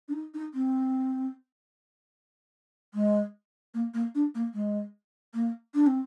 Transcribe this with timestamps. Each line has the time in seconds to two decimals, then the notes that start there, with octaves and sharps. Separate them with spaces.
0.08 D4
0.13 D#4
0.34 D#4
0.54 C4
2.94 G#3
3.74 A#3
3.94 A#3
4.15 D4
4.35 A#3
4.54 G#3
5.34 A#3
5.75 D4
5.87 C4